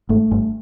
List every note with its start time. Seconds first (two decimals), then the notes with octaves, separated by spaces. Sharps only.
0.09 G#1 G#2 A3
0.31 G1 G2